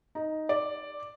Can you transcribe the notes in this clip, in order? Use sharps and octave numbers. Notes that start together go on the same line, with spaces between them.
D#4
D5